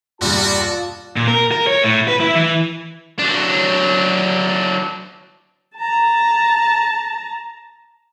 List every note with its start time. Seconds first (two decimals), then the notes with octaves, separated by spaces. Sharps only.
0.21 E1 A#1 G2 G3 F4 F#4 D5 A5
1.16 A#2
1.27 A#4
1.52 A#4
1.67 C#5
1.84 A2
2.08 B4
2.20 E4
2.35 E3
3.19 F#3 D4
5.77 A5 A#5